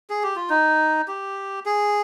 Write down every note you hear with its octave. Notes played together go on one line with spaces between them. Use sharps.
G#4
G4
F4
D#4
G4
G#4